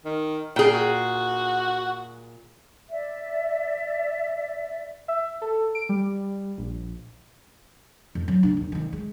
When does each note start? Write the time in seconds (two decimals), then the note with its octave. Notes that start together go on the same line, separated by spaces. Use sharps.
0.05 D#3
0.56 A#2 G#4 G5
0.74 F#4
2.90 D5 E5
5.08 E5
5.42 A4
5.75 D7
5.89 G3
6.58 A#1
8.15 F2
8.28 F#3 A3
8.43 C#3 D4
8.57 D#2
8.72 C2 D#3
8.93 G#3